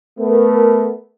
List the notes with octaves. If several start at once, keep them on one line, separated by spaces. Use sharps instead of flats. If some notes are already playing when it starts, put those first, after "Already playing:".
A3 B3 A#4